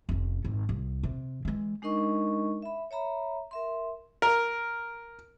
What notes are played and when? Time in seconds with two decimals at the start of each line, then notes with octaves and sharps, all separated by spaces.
0.09 F1 C#4
0.44 G#1
0.69 C2
1.03 C3
1.45 E3 G#3
1.82 G#3 D4 D#4 A#4 D#5 C#6
2.62 E5 B5
2.91 C#5 E5 A#5 B5
3.51 A#4 E5 C6
4.22 A#4